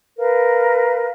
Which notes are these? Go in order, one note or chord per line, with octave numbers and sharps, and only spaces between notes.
A#4 B4 F5